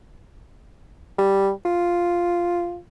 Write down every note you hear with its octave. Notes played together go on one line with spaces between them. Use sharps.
G3
F4